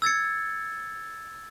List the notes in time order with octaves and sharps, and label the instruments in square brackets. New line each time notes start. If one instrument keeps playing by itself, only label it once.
[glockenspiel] E6 G#6 A6 C#7